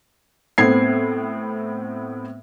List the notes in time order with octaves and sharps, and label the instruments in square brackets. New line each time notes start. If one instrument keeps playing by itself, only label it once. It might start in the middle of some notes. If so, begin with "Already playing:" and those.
[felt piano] A2 B3 C4 G#6 C7